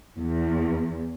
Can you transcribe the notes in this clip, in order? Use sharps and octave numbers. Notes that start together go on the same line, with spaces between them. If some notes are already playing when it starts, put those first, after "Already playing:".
E2